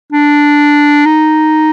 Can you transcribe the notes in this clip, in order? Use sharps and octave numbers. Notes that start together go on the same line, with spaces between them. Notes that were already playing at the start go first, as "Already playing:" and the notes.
D4
D#4